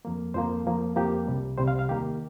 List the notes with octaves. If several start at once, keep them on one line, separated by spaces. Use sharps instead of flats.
F2 F3 A#3
F2 F3 A#3 C5
F2 F3 A#3
F2 F3 A#3 G4
C2 C3 G3
C2 C3 G3 C5
F5
F5
D#2 D#3 A#3 G4